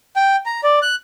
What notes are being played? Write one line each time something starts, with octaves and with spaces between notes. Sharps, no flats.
G5
A#5
D5
F#6